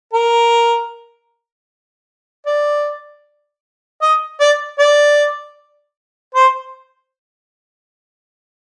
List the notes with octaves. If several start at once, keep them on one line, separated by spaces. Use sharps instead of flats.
A#4
D5
D#5
D5
D5
C5